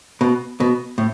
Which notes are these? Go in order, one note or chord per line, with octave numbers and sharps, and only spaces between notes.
B2
B2
A2